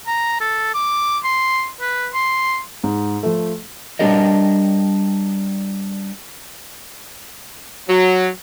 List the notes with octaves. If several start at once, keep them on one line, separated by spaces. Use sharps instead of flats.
A#5
A4
D6
C6
B4
C6
G#2
F3 A3
G3 D4 G4 A#4 D#5
F#3